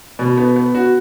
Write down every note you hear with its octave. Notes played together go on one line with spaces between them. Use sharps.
B2
B3
B3
F#4